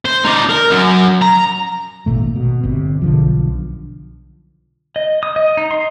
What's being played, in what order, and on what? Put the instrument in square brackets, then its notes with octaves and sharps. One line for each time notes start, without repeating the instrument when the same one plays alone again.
[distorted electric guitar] C5
D#4 D5
A#4
F#2 F#3
A#5
[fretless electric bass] G#1 A#2 A3
B2
G1 C3
B1 D3 F3
[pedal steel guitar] D#5
D#6
D#5
D#4
C6